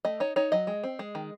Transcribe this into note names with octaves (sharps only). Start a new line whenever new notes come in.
A3 D#5
D#4 C#5
D#4 C#5
F#3 D#5
G#3
C4
G#3
D#3